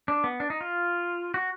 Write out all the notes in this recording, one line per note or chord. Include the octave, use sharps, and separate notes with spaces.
D4
B3
D4
D#4
F4
F#4